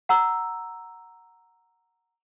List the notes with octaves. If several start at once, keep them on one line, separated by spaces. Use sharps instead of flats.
F#5 A#5 E6